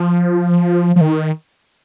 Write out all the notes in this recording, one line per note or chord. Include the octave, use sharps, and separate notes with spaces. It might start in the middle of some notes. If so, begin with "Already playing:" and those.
Already playing: F3
F3
D#3